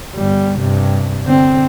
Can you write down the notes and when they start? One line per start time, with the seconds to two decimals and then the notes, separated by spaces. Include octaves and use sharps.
0.15 G1 G3
0.58 G2 C3
1.24 D3 C4